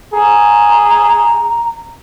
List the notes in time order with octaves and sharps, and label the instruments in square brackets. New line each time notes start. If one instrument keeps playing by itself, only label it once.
[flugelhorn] G#4 [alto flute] A#5